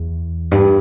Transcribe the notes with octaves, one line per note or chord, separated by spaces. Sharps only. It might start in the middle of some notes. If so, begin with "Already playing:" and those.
Already playing: E2
G2